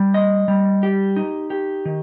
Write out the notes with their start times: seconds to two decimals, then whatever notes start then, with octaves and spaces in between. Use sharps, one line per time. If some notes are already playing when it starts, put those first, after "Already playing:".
Already playing: G3
0.14 D#5
0.48 G3
0.83 G4
1.16 D#4
1.50 G4
1.85 D#3